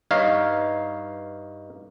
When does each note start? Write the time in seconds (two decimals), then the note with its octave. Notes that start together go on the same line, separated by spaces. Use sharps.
0.11 G2 D#4 C#5 D#5 F5